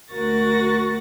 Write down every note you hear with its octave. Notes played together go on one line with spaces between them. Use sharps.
D2 F#4 A#4 C#6 A6 A#6